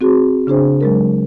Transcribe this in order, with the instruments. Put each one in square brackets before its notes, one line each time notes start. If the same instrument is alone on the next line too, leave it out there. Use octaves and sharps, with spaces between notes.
[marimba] C4 F#4 G#4
C#3 D4 G#4 C5
F#3 G#3 A#4